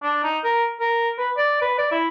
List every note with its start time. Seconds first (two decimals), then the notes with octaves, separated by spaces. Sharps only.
0.03 D4
0.24 D#4
0.44 A#4
0.80 A#4
1.18 B4
1.38 D5
1.62 B4
1.78 D5
1.91 E4